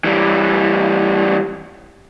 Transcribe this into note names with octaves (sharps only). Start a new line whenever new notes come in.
E3 G3